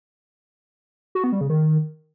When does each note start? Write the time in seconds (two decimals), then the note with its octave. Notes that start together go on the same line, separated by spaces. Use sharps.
1.15 F#4
1.24 B3
1.32 G3
1.41 C#3
1.50 D#3